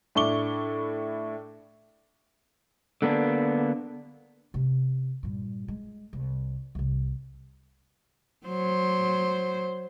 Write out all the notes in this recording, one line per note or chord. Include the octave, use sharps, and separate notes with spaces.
A2 D4 E4 C#6 D6 G7
D3 A#3 B3 D4
C3 C#4
G2 A#2
G#3
C2
C2 C3
F#3 C5